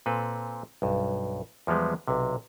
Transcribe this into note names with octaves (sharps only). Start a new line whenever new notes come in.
A#2 C4 A4 B4
B1 G2
E2 F3 G3 G#3 B3
B1 C3